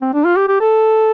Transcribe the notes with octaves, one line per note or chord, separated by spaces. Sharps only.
C4
D4
F4
G4
G4
A4